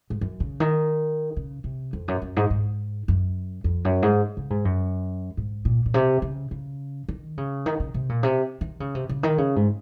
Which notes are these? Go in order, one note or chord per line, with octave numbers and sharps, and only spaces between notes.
G#2
F#2
C#3
D#3
C#3
C3
F2
F#2
F#2
G#2
G#2
F#2
F2
F#2
G#2
C#3
G#2
F#2
G#2
A#2
A#2
C3
C#3
C#3
D#3
C#3
D#3
C#3
C3
A#2
C3
D#3
C#3
C3
C#3
D#3
C#3
G#2